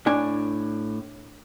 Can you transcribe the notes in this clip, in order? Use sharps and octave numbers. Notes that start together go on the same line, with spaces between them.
A2 D4 G#5